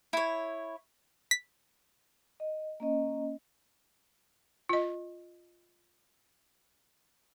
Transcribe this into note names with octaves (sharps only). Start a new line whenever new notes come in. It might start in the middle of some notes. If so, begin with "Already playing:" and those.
E4 C#5
B6
D#5
A#3 C#4 D#5
F4 D#5